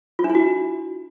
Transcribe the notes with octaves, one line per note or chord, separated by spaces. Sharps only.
F4
D4
E4
F#4